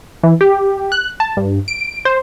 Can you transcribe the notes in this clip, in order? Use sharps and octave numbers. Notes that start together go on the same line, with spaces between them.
E3
G4
F#6
A5
G2
D7
C5